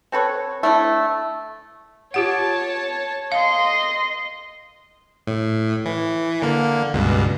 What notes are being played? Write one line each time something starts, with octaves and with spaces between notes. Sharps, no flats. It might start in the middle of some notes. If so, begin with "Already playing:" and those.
C4 A4 B4 C#5
A3 D4 E4
F4 G4 C#5 F#5 A5
D#5 F5 C6
A2
E3
D3 A#3
C#2 G2 B2